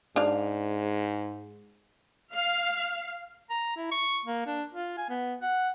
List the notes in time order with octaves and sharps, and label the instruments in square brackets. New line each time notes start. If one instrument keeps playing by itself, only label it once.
[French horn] G#2 [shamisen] D4 F5
[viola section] F5
[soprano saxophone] A#5
E4
C#6
A#3
D4
F4
G#5
B3
F#5